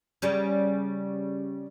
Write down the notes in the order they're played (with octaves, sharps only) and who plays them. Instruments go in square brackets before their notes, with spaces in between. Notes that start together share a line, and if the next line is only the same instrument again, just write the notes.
[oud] C#3 G3 C#4